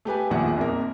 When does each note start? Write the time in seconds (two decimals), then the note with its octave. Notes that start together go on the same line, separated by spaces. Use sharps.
0.05 A3 G4 B4 G#5
0.30 A#1 E2 A2 D#3 F3 F#5
0.56 A#1 F2 A#4